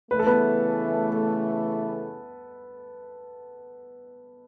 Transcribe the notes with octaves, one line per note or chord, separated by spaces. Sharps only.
C#3 E3 A3 B4
A4
B3 B4